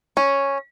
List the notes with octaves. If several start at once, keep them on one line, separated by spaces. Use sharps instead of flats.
C#4